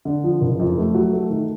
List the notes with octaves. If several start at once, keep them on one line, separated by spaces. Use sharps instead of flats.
D3
F3
F#1
F2
A3
F#3
A3
D#3